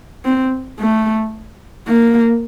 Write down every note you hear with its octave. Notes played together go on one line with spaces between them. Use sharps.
C4
A3
A#3